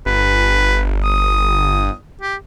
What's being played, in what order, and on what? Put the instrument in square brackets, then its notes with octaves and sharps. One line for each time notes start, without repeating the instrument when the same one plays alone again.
[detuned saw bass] G1 [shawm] B4
[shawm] D#6
G4